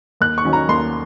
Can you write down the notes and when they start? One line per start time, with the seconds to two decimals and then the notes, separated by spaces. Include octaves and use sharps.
0.21 D#2 F#6
0.38 C#6
0.45 D#3 F#3 C#4
0.53 A#5
0.69 D#2 C6